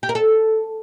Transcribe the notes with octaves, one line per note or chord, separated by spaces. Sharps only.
G4
A#4
A4